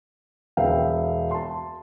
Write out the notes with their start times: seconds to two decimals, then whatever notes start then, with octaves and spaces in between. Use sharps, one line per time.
0.57 E1 B3 E5 F5 G5
1.31 A5 C6